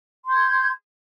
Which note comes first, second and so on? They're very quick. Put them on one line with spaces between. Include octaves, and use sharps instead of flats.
C6 G6 G#6